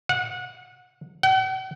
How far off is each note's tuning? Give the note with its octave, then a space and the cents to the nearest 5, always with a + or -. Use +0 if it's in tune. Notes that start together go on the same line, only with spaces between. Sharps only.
F#5 -25
F#5 +45